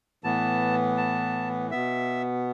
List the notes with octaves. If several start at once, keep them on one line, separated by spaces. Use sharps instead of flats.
A2 E3 B3 A5
A5
B2 B3 E5